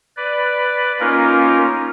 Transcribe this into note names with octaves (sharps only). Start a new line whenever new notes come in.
B4 D5
A#3 C#4 D#4 F4 A#4